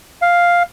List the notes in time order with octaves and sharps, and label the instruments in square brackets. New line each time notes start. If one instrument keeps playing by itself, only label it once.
[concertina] F5